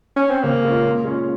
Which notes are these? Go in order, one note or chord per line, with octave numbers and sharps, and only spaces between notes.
C#4
C4
C#3 A#3
G#3 C#4 F4
A#2
G#3 C#4 F4